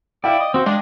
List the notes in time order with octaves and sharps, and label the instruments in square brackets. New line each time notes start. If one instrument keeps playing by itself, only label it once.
[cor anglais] E4 [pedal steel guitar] D5 [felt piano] F5 G5
[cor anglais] D#5
[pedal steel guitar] C4 F#4 [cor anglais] C5
[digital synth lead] G#3 [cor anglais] D4 [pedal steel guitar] D#5 C6